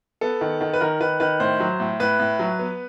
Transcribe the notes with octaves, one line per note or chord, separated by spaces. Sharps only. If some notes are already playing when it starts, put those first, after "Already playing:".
B3 A4
D#3
D#3
B4
D#3 A#4
D#3 B4
D#3 B4
A2 C5
F#3
A2
A2 B4
A2
F#3
B3